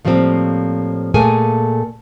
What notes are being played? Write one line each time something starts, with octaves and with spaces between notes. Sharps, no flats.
A2 F3 G3 A#3 C4
A#2 A3 A#3 G#4 G#5